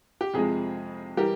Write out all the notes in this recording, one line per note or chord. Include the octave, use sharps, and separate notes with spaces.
G4
F2 C3 F3 G#3 G#4
E3 G3 G4 A#4